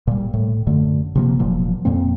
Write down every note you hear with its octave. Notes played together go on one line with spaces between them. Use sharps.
A#2 G3
A2
F#2 D3 A3
C3 F3 A#3
E1 A#2 F3 F#3
F2 A#2 A#3 C4